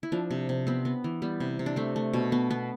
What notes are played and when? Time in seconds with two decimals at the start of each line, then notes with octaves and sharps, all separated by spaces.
0.03 E4
0.12 F3 D4
0.31 C3
0.49 C3
0.67 B3 C4
0.85 B3
1.04 E3
1.22 G3 B3
1.40 C3
1.59 C3
1.66 D4
1.76 A3 C4
1.96 A3
2.13 B2
2.32 B3
2.51 B3